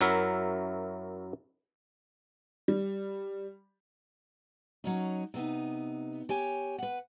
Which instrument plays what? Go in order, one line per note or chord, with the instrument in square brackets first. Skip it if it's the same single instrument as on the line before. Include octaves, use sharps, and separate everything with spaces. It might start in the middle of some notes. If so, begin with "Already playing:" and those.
[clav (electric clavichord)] F#2 F#3 E4 A#4 E5
[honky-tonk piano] G3
[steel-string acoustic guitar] F#3 C#4 D#4
C3 B3 D#4
G4 C#5 G#5
B4 F#5